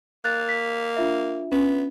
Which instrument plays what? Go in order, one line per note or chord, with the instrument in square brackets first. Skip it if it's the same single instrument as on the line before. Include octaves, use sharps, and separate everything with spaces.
[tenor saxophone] A#3 [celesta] F#6 A6
[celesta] B6
D4 F4 E5
[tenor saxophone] B3 [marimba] C#4